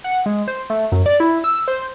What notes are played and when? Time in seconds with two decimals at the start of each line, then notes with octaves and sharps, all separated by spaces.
0.04 F#5
0.26 G#3
0.48 C5
0.70 A3
0.92 F#2
1.06 D5
1.20 E4
1.44 E6
1.68 C5